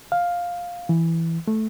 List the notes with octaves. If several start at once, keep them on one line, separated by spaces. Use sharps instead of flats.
F5
E3
A3